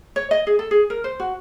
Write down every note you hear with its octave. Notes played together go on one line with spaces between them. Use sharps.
C#5
D#5
G#4
A4
G#4
A#4
C5
F#4